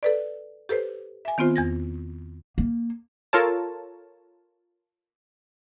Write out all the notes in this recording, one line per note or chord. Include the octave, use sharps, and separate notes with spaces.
A4 B4 D5
G4 A4 B4 C5
E5 G#5
D#3 B3 C4 F4 C5
E2 G#6 A#6
A#3
F4 A4 A#4 C#5 A5